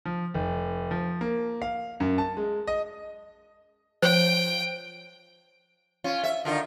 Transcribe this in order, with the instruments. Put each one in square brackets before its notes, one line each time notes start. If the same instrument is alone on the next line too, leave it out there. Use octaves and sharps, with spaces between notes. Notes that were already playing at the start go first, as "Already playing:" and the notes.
[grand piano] F3
F1
F3
A#3
F5
F#2
A5
G#3
D#5
[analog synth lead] F3 [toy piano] C5 C#5 [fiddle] G5
[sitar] C#4 F4
E5
D3 D#3 F4